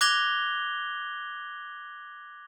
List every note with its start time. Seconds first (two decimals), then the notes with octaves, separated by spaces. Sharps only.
0.01 D6 F#6 G#6 A#6 F7 G7